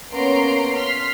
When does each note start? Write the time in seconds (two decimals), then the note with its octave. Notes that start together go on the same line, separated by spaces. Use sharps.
0.11 A#3 B3 C#4 A#5 C6 D7
0.74 C6 F6 B6